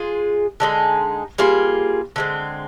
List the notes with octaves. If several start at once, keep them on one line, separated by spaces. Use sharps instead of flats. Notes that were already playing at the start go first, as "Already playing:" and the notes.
Already playing: G#3 F4 G#4
D3 G#3 D#4 G#4
G3 A#3 F4 G#4
D3 G#3 C4